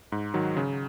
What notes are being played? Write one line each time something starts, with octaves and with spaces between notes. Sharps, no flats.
G#2
D#3 F#3
C#3